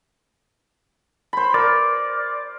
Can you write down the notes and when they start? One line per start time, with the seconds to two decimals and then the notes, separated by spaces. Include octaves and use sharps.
1.33 C5 B5
1.54 A#4 D5